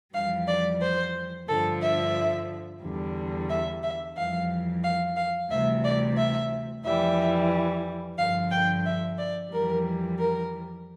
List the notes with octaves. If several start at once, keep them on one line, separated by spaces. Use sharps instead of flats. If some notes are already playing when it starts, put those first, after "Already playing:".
F2 E3 G3 F5
D5
C5
G2 D3 F3 A4
E5
E2 D3 G3
E5
E5
F2 E3 G3 F5
F5
F5
D2 C3 E3 G3 E5
D5
E5
F2 E3 G3 E5
G2 D3 F3 F5
G5
E5
D5
F2 E3 G3 A#4
A#4